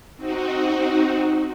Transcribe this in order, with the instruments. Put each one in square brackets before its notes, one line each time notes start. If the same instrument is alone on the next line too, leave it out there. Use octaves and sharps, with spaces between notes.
[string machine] C4 D#4 F#4